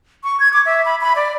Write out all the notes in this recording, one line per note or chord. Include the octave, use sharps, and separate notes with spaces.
C#6
G#6
D6
E5
B5
B5
D5